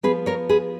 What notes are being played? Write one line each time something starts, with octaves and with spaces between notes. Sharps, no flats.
F3 B3 G#4 B4
A#4 C#5
G#4 B4